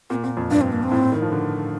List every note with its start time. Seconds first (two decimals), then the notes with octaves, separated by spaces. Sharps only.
0.10 A#2 C4
0.23 A#2 C4
0.37 F2
0.51 G2 D4
0.61 C4
0.72 A#3
0.83 C4
0.91 A2
1.02 A2
1.12 D#3
1.22 F3
1.32 D3